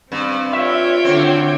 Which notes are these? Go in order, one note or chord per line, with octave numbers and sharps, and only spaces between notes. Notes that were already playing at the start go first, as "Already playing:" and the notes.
G2 C4
F4 C#5 E5 G5
D3 C4 F#4